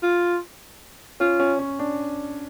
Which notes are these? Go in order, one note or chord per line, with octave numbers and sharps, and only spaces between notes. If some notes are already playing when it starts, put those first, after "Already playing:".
F4
C#4 F4
C#4
C#4
D4